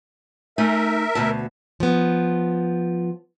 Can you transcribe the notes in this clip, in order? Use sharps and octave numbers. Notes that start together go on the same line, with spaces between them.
A3 D#4 A#4 E5 G#5
D2 B2 A5
F3 B3